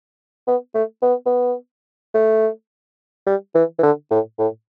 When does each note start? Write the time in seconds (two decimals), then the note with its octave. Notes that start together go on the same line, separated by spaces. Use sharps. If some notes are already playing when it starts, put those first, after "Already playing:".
0.47 B3
0.75 A3
1.02 B3
1.26 B3
2.14 A3
3.27 G3
3.55 E3
3.79 E3
3.83 D3
4.11 A2
4.39 A2